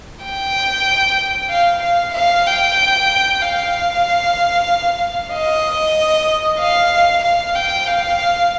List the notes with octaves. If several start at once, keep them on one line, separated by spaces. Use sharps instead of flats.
G5
F5
F5
F5
G5
F5
D#5
F5
F5
G5
F5